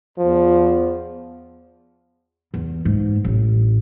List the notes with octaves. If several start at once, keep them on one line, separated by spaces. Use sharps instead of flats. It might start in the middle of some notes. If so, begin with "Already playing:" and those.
E2 F3
E2
G#2
A1